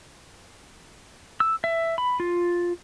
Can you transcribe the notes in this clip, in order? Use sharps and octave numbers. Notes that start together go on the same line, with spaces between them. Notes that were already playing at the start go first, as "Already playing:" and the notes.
E6
E5
B5
F4